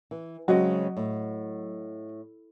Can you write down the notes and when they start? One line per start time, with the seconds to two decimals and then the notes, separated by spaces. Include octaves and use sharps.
0.11 E3
0.48 C#3 F#3 G#3 C4 F#4 D#5
0.97 A2